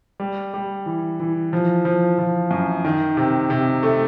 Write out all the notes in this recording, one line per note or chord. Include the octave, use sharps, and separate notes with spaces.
G3
G3
E3
E3
F3
F3
F3
F#2
D#3
C3
C3
A3